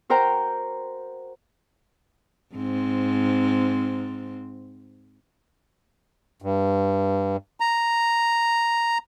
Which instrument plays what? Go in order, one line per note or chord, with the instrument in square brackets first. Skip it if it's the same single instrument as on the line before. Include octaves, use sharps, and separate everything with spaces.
[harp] F#4 A#4 C5 G5 A#5
[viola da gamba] G#2 C4
[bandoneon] G2
A#5